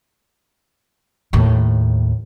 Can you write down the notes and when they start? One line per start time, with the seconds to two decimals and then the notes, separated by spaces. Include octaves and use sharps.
1.33 D#2 A2